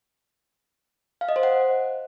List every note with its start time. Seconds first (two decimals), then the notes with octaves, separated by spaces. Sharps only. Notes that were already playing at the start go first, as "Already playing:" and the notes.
1.21 F5
1.29 D#5
1.36 C5
1.43 F#5